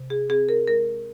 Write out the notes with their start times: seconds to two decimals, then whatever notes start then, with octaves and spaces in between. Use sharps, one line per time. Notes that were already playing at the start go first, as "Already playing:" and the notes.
Already playing: C3
0.10 G#4
0.29 C4 G#4
0.49 A#4
0.68 G#3 A#4